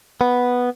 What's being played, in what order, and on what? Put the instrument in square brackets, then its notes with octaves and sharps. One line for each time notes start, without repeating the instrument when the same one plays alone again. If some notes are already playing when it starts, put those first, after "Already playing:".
[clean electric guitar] B3